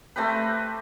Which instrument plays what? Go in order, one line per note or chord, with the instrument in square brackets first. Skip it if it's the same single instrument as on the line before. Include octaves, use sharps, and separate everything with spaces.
[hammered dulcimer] A3 C4 G4 B4